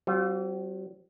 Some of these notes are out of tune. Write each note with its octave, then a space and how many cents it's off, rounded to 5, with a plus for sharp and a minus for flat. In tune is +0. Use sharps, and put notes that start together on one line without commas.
G3 -45 C4 +0 F4 +30